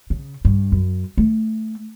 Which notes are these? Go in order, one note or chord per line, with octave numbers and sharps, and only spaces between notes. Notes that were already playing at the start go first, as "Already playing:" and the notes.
C#3
G2
F#2
A3